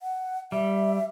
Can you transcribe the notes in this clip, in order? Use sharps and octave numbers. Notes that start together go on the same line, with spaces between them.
F#5
G3 E5